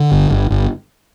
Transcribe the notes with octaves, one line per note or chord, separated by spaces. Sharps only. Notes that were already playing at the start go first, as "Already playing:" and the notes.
Already playing: D3
G1
G1
G1